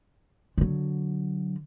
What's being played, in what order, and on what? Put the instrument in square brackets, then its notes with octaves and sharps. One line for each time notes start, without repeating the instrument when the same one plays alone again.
[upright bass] D3 F#3